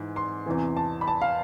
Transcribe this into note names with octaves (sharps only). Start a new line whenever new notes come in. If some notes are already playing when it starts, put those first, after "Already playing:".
Already playing: G#2 E3
C6
E2 C3 E3
A5
B5
A5
F5